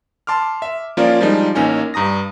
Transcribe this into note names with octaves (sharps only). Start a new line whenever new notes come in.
A5 C6 D6 F6
E5
F3 A#3 C#4 F4 A#4 D5
F3 G3 G#3 D4 D#4
A1 A#3 C#4 D#4 G#5
G2 A#5 D#6 A#6